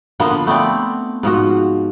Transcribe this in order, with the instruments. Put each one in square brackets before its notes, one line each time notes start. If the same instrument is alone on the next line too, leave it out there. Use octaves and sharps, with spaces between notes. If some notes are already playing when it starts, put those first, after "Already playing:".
[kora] D3 F3 A#3 B3
A3 B3 C4 D5
G#2 F3 F#4